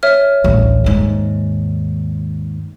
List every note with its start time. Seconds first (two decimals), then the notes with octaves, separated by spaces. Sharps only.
0.03 C#5 E5 F6
0.44 A1 D2
0.84 D#2 G#2